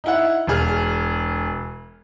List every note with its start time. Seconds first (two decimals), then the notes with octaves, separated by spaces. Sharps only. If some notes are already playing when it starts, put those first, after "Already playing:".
0.04 D#4 E4 F#5
0.47 E1 G#4 F6